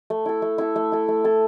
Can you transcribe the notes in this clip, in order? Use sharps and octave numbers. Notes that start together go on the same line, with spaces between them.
A3
E4 A4
A3
E4 A4
A3
E4 A4
A3
E4 A4